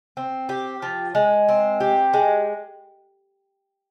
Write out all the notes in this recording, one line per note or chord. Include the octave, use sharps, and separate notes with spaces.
C4
G4
F3
G#3
C4
G4
G#3